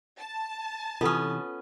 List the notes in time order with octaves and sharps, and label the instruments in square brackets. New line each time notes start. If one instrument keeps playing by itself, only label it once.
[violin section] A5
[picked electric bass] C3 E3 [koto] B3 C#4 [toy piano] F4 A4 D#6